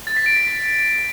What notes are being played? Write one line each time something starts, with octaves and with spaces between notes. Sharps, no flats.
A6
B6
D7
B6